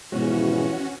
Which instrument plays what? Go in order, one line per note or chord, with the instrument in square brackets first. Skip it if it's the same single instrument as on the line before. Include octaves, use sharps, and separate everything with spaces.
[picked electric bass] G#1 B2 G#3 [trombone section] E2 F3 E4 [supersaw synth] C#4 F#4